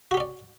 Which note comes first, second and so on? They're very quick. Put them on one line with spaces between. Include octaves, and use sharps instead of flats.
F#4 G4 C#4 D5